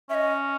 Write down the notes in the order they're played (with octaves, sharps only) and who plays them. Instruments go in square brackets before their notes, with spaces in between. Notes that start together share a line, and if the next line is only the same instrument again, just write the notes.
[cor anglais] C#4 [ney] D#5 E5